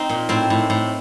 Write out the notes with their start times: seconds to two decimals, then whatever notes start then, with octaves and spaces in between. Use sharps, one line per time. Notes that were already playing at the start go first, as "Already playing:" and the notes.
Already playing: C4 D#4
0.09 A#2
0.29 A2 C4
0.50 A2
0.70 A2